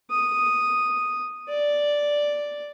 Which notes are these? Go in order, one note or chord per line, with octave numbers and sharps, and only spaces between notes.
D#6
D5